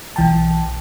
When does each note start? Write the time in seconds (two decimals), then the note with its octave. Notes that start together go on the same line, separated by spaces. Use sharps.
0.16 B1 E3 G5 A5